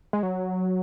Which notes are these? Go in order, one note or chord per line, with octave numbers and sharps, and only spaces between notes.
G#3
F#3